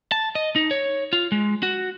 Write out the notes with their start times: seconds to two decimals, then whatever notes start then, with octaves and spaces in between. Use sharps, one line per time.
0.12 A5
0.35 D#5
0.56 D#4
0.71 C#5
1.13 F4
1.32 G#3
1.63 F#4